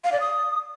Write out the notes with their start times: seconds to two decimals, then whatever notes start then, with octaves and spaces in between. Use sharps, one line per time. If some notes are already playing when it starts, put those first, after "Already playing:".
0.04 F5
0.12 D5
0.20 D#6